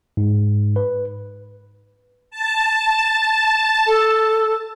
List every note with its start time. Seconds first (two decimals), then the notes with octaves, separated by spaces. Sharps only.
0.17 G#2
0.76 B4
2.31 A5
3.87 A4